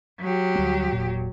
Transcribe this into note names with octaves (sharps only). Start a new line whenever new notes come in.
F#3 G4
D2 G3
E1 A#2